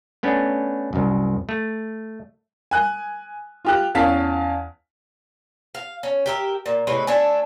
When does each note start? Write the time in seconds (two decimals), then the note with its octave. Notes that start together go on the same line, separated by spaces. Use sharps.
0.23 A3 B3 C#4 D4
0.93 C2 F#2
1.49 A3
2.71 G#5 F#6
3.65 F4 G4 F#6
3.94 E2 C#4 F5 A5 B6
5.75 F5
6.03 C#4
6.26 G4 A#4 E5
6.66 A#2
6.87 A2 C3 G#3 B4
7.07 A3 D4 E5 G#5